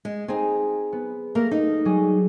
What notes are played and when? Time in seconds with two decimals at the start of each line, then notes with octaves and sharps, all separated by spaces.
0.05 G#3
0.28 C4 D#4 G#4 G#5
0.92 B3
1.35 A3 A#3 A#4 F5
1.51 D#4
1.85 F#3 G3 G#4